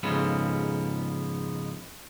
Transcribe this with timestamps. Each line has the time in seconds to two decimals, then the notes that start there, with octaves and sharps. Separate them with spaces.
0.03 F2 G#2 C#3 B3